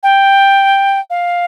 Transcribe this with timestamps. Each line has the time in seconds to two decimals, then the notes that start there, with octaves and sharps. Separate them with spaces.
0.03 G5
1.10 F5